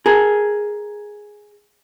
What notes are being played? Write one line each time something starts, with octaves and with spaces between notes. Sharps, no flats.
G#4 A#4